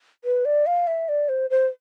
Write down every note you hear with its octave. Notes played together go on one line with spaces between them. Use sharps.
B4
D5
F5
E5
D5
C5
C5